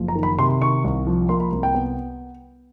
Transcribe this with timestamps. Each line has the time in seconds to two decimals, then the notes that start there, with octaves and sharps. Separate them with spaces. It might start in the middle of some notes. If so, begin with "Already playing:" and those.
Already playing: F#1 F3
0.08 A#5
0.16 D#3
0.23 B5
0.38 C3 C6
0.61 D#3 C#6
0.84 C2
1.07 F3
1.29 A#3 C6
1.40 B5
1.52 C2
1.63 G5
1.75 B3